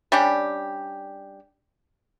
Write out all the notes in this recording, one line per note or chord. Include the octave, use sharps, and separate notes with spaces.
G3 C#4 D4 G4